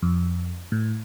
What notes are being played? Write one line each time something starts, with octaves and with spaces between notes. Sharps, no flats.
F2
A2